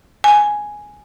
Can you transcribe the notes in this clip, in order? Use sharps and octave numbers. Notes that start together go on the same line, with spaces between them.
G#5